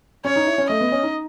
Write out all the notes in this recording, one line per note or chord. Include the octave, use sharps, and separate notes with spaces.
C#4 C#5
D#4
E4
C#4
A3 D#5
B3
C#4
D#4